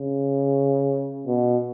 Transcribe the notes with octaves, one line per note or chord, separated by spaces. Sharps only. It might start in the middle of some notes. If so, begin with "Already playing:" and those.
Already playing: C#3
B2